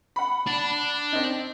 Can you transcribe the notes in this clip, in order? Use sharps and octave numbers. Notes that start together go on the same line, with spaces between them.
F#5 B5
D4
C4 D#4